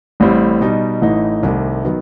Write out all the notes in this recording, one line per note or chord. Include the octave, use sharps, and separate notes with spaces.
A1 A2 G3 C4 E4
B2 G3 D#4
A1 A2 E3 A3 D#4
C2 C3 D#3 A3
D#3 F#3 B3